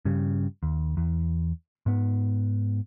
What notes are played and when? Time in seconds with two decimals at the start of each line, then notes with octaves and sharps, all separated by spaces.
0.05 G2 C#3 G3
0.63 D#2
0.97 E2
1.86 G#2 B3